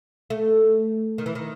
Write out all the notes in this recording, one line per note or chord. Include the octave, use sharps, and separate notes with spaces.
A3
D#3
E3
D#3